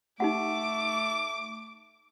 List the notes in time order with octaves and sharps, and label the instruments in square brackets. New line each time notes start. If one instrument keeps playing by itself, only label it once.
[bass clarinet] A3 [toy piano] D#4 G4 F#5 [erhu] D6